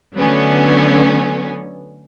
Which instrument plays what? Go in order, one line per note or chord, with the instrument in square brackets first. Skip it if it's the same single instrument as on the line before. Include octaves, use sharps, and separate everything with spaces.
[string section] D3 F#3 A3 B3 C#4